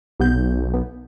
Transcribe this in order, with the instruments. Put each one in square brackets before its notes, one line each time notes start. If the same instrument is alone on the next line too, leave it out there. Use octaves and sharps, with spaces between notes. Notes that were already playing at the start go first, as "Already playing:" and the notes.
[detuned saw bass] B1 [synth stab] C3 B3 G6
[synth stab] B3